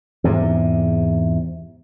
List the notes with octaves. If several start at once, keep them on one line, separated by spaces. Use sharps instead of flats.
E2 G#2 C3